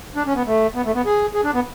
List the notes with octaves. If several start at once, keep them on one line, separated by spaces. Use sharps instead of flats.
D4
C#4
B3
A3
B3
A3
B3
G#4
G#4
D4
B3